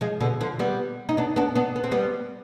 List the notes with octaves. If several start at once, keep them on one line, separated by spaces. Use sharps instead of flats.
F3 G#3
B2 D3
D3 F3
G3 B3
D#4
B3 D4
B3 D4
B3 D4
B3
C4
G3 B3